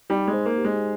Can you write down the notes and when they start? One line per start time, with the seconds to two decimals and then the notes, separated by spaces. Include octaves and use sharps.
0.10 G3 D#4
0.28 G#3
0.34 C5
0.46 A#3
0.58 G4
0.64 G#3